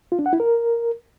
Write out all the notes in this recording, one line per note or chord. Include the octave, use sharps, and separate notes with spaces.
F4
D4
F#5
E4
A#4